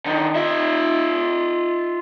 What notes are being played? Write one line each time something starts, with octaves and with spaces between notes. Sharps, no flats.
D3 D#3
F4 E5